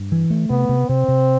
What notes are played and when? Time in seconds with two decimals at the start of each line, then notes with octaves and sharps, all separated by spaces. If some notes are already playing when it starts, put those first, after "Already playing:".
Already playing: G2
0.12 E3
0.30 A3
0.50 C3 B3
0.69 C3
0.89 C3 C4
1.08 C3